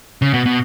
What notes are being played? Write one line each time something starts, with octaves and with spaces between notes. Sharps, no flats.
C#3
B2
B2